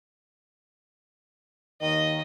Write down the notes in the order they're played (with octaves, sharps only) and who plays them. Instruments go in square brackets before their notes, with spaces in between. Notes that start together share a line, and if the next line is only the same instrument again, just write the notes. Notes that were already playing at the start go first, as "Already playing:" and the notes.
[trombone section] D#2 D#3 [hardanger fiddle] D#5